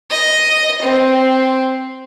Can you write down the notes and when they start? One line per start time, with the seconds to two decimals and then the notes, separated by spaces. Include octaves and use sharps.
0.10 D#5
0.82 C4